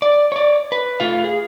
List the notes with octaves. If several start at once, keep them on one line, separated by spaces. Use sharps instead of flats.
D5
C#5 D5
B4
A3 F4 F5
G#4